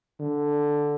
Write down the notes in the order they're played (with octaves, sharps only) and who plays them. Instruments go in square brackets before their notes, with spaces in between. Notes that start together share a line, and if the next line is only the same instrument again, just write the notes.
[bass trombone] D3